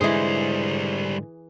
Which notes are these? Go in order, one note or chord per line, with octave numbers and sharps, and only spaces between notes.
G#2 D3 E3 G3 G#3 G#4 C5